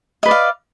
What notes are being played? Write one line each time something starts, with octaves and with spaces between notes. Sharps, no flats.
B4 D5 D#5 F5